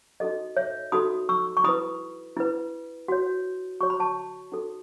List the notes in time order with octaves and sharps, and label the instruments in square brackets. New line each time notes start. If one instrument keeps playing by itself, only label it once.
[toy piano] D#4 F#4 A4 D#5
C#5 E5
D#4 F#4 A4 B5 D#6
C#6 E6
C#6
E4 B4 B5 D#6
E4 B4
F#4 C#5
F#4 C#5 C#6
B5
A5 C#6
D#4 F#4 A4